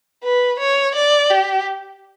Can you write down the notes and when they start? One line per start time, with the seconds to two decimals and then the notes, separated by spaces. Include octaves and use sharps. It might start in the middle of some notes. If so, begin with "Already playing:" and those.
0.23 B4
0.59 C#5
0.95 D5
1.30 G4